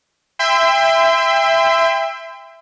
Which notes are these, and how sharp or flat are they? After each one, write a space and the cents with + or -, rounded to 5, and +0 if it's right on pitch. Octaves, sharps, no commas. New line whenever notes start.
E5 +5 G5 +30 C6 -35